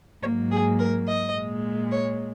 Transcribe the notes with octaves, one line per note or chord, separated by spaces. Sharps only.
G#2 F#3 A#3 C#5
G#4
A#4
D#5
A#2 G#3
C#5